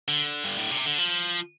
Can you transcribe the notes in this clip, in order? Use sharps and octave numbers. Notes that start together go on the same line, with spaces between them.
D3
G2
A2
C3
D3
F3